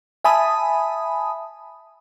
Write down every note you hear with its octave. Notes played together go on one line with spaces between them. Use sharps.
E5 G#5 A5 B5 D#6